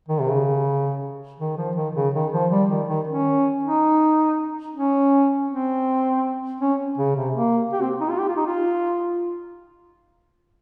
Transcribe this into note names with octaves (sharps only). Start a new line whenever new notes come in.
D#3
C3
C#3
D#3
F3
D#3
C#3
D#3
F3
G3
D#3
D#3
C#4
D#4
C#4
C4
C#4
C#3
C3
A#3
G4
C4
D#4
F4
G4
F4
D#4
F4